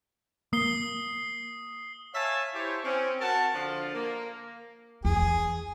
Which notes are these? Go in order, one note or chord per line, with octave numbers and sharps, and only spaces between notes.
A#3 D#6 C7 G7
C#5 E5 F5 G#5 A5
E4 G4 C5 C#5
C4 C#4
F#4 A#4 F#5 A5
D3 F3 D4 F4
A#3
E2 G#4